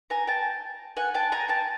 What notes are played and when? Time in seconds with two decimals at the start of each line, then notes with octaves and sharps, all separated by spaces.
0.10 G#5 A#5
0.27 G5 A5
0.97 F#5 G#5
1.14 G5 A5
1.32 G#5 A#5
1.48 G5 A5